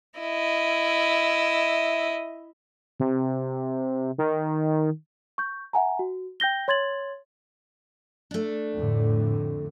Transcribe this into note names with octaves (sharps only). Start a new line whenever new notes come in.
E4 D#5
C3
D#3
C#6 G6
E5 F#5 G#5 A#5
F#4
G5 G6 A#6 G7
C#5 C6 G#6 A6 F#7
A3 D4
F2 A2 D3